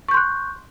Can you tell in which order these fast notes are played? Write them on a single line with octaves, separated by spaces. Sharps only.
C#6 G6 C6 F#6